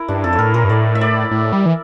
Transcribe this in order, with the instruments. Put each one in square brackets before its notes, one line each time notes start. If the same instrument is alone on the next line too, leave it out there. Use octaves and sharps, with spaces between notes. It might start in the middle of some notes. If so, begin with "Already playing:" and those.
Already playing: [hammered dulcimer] E4 A#4
[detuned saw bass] G2 [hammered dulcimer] D4
[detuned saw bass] F2 [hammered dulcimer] A4
[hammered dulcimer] C#5
[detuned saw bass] A2 [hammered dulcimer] A#4
[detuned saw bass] A#2 [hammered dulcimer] A#4
[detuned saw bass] G2
[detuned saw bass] A2 [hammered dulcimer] D5
[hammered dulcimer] E5
D5
[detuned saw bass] A2
G3
E3